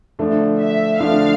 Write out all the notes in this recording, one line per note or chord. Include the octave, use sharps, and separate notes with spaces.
D3 F3 A3 D4
E5
D3 F3 A3 D4 F5